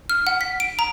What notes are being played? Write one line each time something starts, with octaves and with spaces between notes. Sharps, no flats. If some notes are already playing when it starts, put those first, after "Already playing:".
F6
F#5
B6
D7
A#5